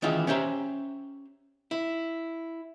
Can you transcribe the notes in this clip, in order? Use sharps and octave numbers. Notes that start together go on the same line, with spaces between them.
D#3 E3 C#4 E4 F4 G#4
C#4 G4 C5 E5 A#5
E4